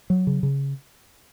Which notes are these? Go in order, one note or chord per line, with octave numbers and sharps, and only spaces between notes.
F#3
C#3
C#3